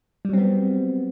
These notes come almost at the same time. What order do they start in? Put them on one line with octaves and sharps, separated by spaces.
G3 F#3 C4 B3